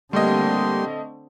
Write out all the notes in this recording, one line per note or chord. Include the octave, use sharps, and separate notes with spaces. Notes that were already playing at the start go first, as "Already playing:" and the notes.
D3 G3 A3 A#3 C4 G4 D#5 C6